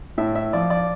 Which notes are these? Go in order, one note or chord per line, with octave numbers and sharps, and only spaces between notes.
A2 E5
E5
F3 D5
D5